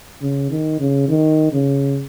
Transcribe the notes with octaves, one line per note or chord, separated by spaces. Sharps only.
C#3
D#3
C#3
D#3
C#3